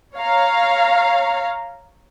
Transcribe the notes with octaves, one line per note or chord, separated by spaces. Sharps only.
C#5 F5 A#5